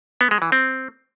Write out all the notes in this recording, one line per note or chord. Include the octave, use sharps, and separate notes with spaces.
B3
G#3
E3
C4